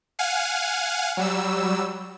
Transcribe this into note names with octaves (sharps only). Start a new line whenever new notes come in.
F5 F#5 G#5
F#3 G3 E6